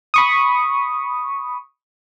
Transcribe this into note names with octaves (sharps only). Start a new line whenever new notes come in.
B5 C#6 D#6